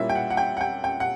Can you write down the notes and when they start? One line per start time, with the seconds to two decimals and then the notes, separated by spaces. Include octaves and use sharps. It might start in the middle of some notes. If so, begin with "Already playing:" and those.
Already playing: A#2 G3 A#3 C#4 E4 E5
0.09 G5
0.15 F#5
0.30 F#5
0.37 G5
0.57 F#5
0.61 G5
0.84 G5
1.00 F#5